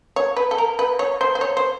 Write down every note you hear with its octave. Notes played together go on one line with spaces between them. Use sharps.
C#5
B4
A4
A#4
B4
C#5
C5
C5
C#5
C5